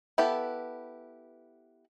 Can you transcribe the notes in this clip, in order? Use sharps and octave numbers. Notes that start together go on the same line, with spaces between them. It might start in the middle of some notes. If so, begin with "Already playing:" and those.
B3 E4 G4 A4 B4